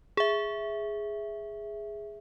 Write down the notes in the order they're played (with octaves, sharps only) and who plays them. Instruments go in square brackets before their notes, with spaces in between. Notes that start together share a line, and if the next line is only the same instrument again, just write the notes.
[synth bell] G#4 E5